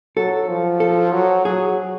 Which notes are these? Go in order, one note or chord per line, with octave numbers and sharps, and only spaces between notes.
F#3 A4
F3
A4
F#3
F#3 G#4